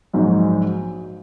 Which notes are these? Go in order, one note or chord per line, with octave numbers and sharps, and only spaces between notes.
A#1 G#2 F#3